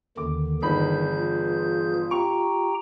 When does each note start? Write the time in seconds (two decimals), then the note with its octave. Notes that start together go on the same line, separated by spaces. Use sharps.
0.17 D#2 D3 D#3 D6
0.62 G1 D#3 E3 D#4 G#4 B5 G6
1.16 F4
2.11 G4 G5 A#5 C#6